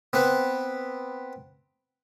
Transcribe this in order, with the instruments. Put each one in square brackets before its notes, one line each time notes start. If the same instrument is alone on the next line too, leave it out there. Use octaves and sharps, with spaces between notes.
[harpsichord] B3 C4 B4